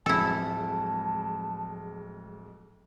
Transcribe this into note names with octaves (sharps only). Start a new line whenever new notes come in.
D1 F2 F3 G#3 E4 G#4 A4 A5